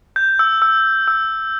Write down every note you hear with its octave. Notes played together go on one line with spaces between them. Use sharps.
G6
E6
E6
E6